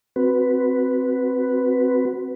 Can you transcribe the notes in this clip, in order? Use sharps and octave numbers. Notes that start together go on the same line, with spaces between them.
C4 F#4 B4